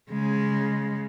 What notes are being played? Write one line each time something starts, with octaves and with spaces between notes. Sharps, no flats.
C#3 G#3